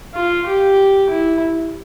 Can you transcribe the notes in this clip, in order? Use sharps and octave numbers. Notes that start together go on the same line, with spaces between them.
F4
G4
E4